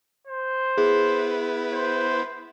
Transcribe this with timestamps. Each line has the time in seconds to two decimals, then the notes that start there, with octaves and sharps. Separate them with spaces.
0.27 C5
0.77 B3 E4 G#4 B4
1.73 C5